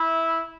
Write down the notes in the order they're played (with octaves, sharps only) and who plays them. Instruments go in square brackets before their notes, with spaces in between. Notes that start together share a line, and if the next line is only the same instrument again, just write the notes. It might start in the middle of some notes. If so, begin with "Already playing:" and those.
Already playing: [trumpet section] E4